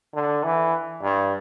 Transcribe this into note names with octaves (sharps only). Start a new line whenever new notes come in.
D3
E3
G2